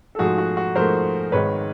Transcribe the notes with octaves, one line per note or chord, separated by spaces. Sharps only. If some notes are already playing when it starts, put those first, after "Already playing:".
A4
G#2 F3 A3 F#4 G#4
F#4
F#4
G#2 F3 A3 A#4 C5
G#1 G#2 D#3 B4 C#5